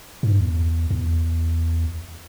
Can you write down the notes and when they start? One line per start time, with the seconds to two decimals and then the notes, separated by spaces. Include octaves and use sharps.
0.23 G#2
0.31 G2
0.39 E2
0.91 E2